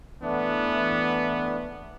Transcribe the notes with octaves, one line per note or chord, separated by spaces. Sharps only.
E3 A3 B3 D4